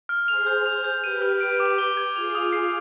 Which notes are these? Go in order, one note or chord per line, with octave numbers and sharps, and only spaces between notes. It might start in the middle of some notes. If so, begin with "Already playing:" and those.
F6
G#4 C5 F7
G6
F7
G6
G4 B4 D#7
F6
D7
D6
G7
G#6
F4 G#4 F7
D#6
C7